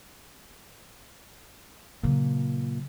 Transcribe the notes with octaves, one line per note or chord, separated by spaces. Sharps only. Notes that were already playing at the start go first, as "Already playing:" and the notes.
A#2 C#3 F#3